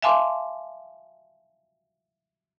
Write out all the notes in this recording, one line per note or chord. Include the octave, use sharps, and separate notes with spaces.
E5 F5 G#5 A5 C6 D6